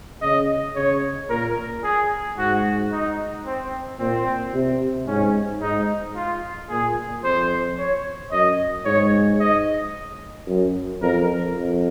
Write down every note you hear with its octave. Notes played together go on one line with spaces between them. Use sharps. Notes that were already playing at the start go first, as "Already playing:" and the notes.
C#3 D#5
C#3 C#5
A#2 A#4
G#4
G#2 F#4
D#4
C4
A#2 C4
C3
G#2 C#4
G#2 D#4
F4
A#2 G#4
F2 C5
C#5
F#2 D#5
G#2 C#5
D#5
F#2
F2 A#4
F2